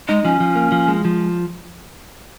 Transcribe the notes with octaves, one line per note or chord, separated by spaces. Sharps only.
G#3 D#4
F3 C#4
F3
A#3
F3
G#3
F3